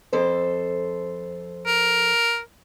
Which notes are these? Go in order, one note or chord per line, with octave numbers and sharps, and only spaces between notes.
F2 A4 C5
A#4